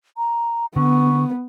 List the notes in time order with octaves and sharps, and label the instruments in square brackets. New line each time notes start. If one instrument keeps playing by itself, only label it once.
[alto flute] A#5
[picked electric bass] D3 [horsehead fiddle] B3 [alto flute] C#6